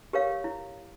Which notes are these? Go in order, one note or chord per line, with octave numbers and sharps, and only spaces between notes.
G4 A#4 C#5 F5
E4